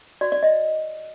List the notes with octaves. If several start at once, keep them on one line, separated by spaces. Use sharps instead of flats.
F#4 D5
D5
C#5 D#5